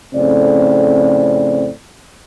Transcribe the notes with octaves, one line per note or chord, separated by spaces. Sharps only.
F2 A2 C#3 C4 D5